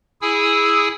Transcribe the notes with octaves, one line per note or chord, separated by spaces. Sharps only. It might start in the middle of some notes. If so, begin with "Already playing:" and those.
E4 G#4 G#5 D#6 E6